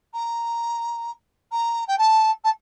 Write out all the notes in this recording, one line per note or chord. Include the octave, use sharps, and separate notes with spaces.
A#5
A#5
G5
A5
A5